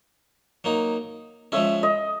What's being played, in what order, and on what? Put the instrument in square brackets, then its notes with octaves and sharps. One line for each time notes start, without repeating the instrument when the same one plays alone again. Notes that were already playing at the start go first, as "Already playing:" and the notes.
[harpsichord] F#3 A#3 D#4
[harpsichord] F3 G#3 C#4 [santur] E5
[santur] D#5